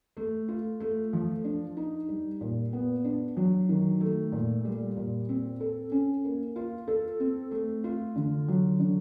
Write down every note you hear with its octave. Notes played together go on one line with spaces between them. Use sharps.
A3
F4
A3
F3
D4
D#4
G3
A#2
B3
D4
F#3
D#3
A3
A#2
G3
A#2
C4
A4
C#4
A#3
F4
A4
C4
A3
F4
D3
F#3
D3